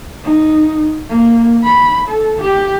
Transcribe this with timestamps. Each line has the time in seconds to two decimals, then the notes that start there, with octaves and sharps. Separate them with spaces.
0.23 D#4
1.09 A#3
1.64 B5
2.08 A4
2.41 G4